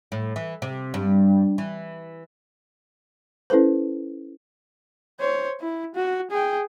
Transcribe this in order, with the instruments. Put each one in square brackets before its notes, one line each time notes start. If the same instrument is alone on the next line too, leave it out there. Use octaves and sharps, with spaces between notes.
[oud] A2
E3
C3
G2
E3
[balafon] C#4 E4 A4 B4 C5
[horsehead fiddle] C5 C#5
E4
F#4
G#4 G5